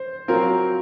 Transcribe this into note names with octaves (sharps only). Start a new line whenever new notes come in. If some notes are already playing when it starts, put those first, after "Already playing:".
Already playing: C5
F#3 C4 F4 A#4